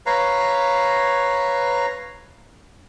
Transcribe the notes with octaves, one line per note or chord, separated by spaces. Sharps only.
B4 C#5 F5 A#5